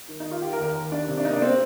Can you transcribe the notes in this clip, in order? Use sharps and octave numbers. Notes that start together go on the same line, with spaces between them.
D#3
D#4
D#3
F4
D#3 G4
A#4
D#2
A#4
D#2
D#3 D4
C3
D4
A#3 D#4
D4
C4